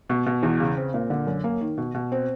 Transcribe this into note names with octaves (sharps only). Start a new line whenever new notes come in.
B2
B2
E2
C#3
C4
A#2
D3
F#2
A#3
D#3
B2
B2
C4